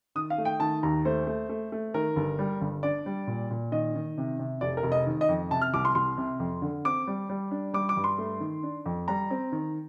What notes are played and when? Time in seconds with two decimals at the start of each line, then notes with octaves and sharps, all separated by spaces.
0.15 D#3 D#6
0.30 F5
0.38 A3
0.45 G5
0.60 D#3 A5
0.83 D#2 A#5
1.05 A3 C5
1.27 A3
1.49 A3
1.72 A3
1.94 D#3 A#4
2.16 G1
2.39 G3
2.61 G1
2.83 D4 D5
3.06 G3
3.27 A#2
3.51 A#2
3.72 D#3 D#5
3.95 D#3
4.18 C3
4.39 C3
4.61 F1 D5
4.77 A#4
4.83 F1
4.92 D#5
5.07 D#3
5.21 D#5
5.29 F2
5.51 C3 A5
5.61 F6
5.73 C2 D6
5.85 C6
5.95 C2 C6
6.17 C3
6.40 F2
6.62 D3
6.85 C4 D6
7.07 G3
7.29 G3
7.51 D4
7.74 G3 D6
7.89 D6
7.97 G2
8.04 C6
8.18 A3
8.40 D#3
8.63 D4
8.86 F2
9.08 G3 A#5
9.30 C4
9.52 D#3